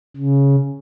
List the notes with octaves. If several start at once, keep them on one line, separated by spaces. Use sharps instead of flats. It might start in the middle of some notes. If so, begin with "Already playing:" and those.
C#3